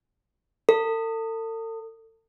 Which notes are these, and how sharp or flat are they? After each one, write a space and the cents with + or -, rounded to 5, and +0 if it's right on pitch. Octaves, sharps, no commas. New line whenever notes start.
A4 +40